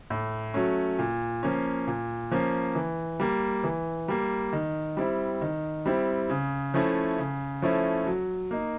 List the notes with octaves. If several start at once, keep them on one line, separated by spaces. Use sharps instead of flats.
A2
F#3 A3 C#4
A#2
F3 A#3 C#4
A#2
F3 A#3 C#4
E3
G3 A#3
E3
G3 A#3
D#3
G3 C4 E4
D#3
G3 C4 E4
C#3
F3 A3 C#4 E4
C#3
F3 A3 C#4 E4
F#3
A#3 D#4